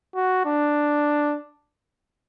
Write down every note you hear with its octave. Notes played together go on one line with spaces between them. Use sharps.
F#4
D4